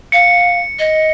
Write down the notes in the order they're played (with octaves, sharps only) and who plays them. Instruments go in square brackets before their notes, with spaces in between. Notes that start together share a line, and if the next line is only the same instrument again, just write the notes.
[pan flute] F5 [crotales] C#7
[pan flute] D#5